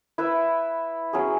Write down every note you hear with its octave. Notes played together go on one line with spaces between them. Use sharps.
E4 B4 E5
F#3 C#4 G#4